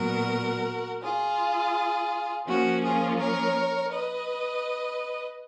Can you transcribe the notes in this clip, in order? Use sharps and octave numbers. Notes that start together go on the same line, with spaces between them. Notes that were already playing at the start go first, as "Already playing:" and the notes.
Already playing: A#2 F#3 B3 F#4 A#4
F4 G#4
F3 A#3 C#4 F#4
F4 G#4
A#4 C#5
B4 D#5